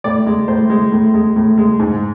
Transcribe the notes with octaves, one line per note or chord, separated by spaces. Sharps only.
A2 D5
G#3
A2 C5
G#3
A2
G#3
A2
G#3
G#2